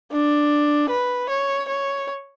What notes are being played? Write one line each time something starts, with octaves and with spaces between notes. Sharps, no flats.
D4
B4
C#5
C#5